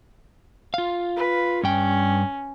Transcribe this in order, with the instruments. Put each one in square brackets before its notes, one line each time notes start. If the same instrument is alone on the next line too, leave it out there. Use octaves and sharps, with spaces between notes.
[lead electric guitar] F4 F5
[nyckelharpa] B4
[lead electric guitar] G2 G5 [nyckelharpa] C#4